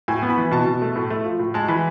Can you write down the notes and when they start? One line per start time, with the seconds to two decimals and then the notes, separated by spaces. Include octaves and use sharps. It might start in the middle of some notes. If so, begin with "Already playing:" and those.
0.08 A2 G#5
0.22 B3
0.30 B5
0.38 E3
0.51 B2 A5
0.66 B2
0.82 A3
0.96 A2
1.10 A3
1.25 F3
1.39 A2
1.54 G#3 A5
1.68 E3 B5